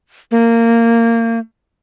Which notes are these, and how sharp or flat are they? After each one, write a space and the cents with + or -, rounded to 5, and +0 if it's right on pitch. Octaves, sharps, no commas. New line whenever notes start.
A#3 -20